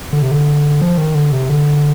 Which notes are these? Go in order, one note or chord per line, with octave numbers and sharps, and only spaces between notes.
D3
C3
D3
F3
D#3
D3
C3
D3